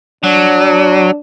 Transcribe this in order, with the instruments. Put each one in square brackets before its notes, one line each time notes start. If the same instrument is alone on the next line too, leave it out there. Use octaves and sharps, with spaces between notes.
[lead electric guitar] F#3 [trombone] D4